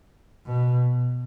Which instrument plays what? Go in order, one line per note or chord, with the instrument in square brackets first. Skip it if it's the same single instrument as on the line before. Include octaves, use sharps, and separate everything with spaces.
[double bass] B2